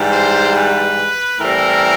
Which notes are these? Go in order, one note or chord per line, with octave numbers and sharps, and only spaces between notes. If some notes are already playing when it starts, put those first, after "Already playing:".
Already playing: G#2 E3 G3
C5
B4
A2 E3 G3 C4 A#4